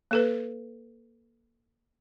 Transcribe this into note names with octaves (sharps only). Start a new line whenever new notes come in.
A#3 A4 B4